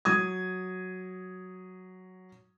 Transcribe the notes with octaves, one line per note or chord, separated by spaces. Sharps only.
F#3 D#6 G#6